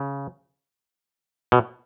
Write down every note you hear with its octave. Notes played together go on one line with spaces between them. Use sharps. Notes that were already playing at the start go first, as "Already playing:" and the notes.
Already playing: C#3
B2